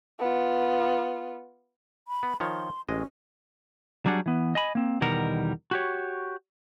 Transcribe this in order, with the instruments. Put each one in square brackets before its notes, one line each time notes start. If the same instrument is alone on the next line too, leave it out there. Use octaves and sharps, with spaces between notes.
[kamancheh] B3 F4
[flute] B5
[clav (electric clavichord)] B3
[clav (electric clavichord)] D#3 F3 C#5 [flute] C6
[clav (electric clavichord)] A1 G#3 D#5 [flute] C#4
[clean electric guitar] F#3 G3 D4 G#4 F#5
E3 B3
D#5 G#5 B5
A#3 C4
E2 B2 D#3 G3 A#4 F#5
F#4 G4 C#5